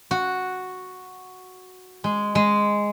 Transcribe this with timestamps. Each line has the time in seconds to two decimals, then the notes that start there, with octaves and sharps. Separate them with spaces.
0.11 F#4
2.04 G#3
2.35 G#3